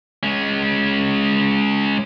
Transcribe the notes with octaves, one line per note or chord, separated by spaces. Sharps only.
G#3 C#4